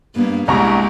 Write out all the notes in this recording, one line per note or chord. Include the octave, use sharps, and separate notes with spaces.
G2 A#3 B3
C2 G#3 E4 G4 A#5 C#6